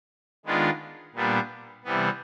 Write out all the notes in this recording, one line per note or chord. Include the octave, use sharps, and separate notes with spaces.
D#3 G#3 B3 D4 F4
A#2 G3 B3 D4
C3 E3 G3 B3